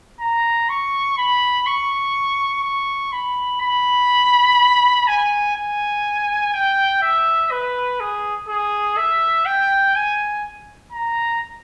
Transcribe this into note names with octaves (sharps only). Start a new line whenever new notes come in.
A#5
C#6
B5
C#6
C#6
B5
B5
G#5
G#5
G5
E5
B4
G#4
G#4
E5
G5
G#5
A#5